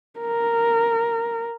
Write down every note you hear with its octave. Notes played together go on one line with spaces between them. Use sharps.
A#4